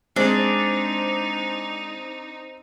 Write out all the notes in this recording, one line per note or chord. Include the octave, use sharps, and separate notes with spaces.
G#3 C4 D4 D#4 G#4